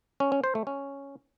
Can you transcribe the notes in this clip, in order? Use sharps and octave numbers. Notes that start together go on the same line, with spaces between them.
C#4
C#4
C5
A3
C#4